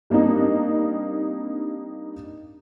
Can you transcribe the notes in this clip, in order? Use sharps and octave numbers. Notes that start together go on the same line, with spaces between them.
G3 A#3 C4 D4 D#4